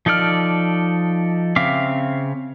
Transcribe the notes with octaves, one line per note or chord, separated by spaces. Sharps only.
F3 D#4 A4 D5 F6
C#3 C4 E5 F5 D6